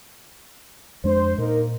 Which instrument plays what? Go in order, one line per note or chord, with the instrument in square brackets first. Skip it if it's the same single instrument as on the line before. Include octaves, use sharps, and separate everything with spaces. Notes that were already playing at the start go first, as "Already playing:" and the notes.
[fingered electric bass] F2 G#3 D4 [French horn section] C5
[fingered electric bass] A#2 [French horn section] A#3 D#4 A#4